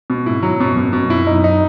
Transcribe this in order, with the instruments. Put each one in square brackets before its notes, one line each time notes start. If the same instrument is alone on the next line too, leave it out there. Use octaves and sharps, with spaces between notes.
[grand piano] B2
[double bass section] G#2 [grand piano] E4
[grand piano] F#3
[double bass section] F#2 [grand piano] B2
[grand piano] B2
[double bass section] F#2 [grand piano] B2
[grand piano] E4
[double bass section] F#2 [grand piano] D#4
[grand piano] D#4